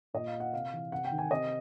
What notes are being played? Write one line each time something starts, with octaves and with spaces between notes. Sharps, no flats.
A#2 D#5
F5
F#5
C3 F5
E3
C3 F#5
G5
D#3
G#5
C3 D#5